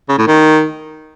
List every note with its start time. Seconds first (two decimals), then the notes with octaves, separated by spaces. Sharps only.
0.09 C#3
0.18 A2
0.27 D#3